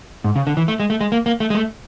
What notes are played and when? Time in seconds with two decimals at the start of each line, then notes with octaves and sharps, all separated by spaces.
0.24 G#2
0.36 C#3
0.47 D3
0.57 E3
0.68 A3
0.80 G#3
0.90 A3
1.01 G#3
1.12 A#3
1.26 A#3
1.40 A3
1.50 G#3
1.55 A3